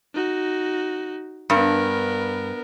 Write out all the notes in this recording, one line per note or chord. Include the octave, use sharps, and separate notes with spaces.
D#4 F#4
G2 B3 A#4